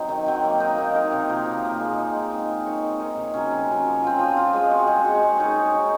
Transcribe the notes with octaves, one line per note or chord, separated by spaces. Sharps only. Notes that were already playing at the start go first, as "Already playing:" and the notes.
Already playing: F#3 C4 D#4
D#3
F#3 C4
A#3
D#4 A#4
A#3
D#4 A#4
C3
F3 A#3
C3
F3 A#3
G#3
C4 D#4
G#3
C4 D#4
C4
D#4 A#4 C#5
C4
D#4 A#4 C#5
C3
F#3 C#4
C3
F#3 C#4
F3
C4 F4
F3
C4 F4
G#3
C4 F#4
G#3
C4 F#4
G#3
D#4 A#4 C#5
G#3
D#4 A#4 C#5